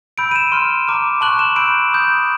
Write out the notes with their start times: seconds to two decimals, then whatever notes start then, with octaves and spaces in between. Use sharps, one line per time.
0.18 B5 E6 G6 D7
0.31 D#7
0.36 E7
0.52 C6 F6
0.87 A#5 D6 F6
1.21 A5 C#6 F#6 F#7
1.39 E7
1.56 B5 E6 G6 D7
1.91 B5 D#6 G6